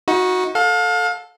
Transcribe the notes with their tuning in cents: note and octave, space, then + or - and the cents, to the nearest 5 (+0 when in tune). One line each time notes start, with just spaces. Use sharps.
D#4 +35 F#4 -15
A4 +0 F5 +35